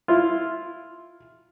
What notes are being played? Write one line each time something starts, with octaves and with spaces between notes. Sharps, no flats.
E4 F4